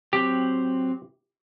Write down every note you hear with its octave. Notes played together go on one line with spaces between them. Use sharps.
F#3 C4 G4